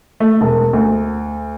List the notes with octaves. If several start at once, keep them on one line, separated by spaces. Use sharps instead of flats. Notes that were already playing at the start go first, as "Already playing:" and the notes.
A3
E1
D2